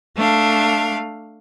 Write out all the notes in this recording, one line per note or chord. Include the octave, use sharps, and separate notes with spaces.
A3 D4 F5